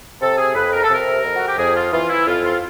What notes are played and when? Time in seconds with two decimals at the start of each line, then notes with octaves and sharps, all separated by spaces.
0.21 C3 A4
0.38 G#4
0.55 F2 B4
0.73 A#4
0.83 A4
0.90 C3 A#4
1.24 F2
1.36 F#4
1.47 G4
1.58 F2 G#4
1.76 F4
1.93 E3 F4
2.09 E4
2.27 F2 F4
2.44 F4